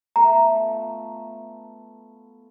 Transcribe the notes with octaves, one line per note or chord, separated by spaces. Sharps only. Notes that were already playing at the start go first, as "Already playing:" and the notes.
A3 B3 F4 A#5